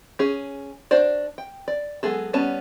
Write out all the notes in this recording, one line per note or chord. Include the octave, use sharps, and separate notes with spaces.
C#4 G#4
D4 F#4 C5 D5
G5
D5
F#3 G#3 B3 G#4 A4
G3 B3 C#4 A5